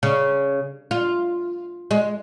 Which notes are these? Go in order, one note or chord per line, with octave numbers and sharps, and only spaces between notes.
C#3
F4
G#3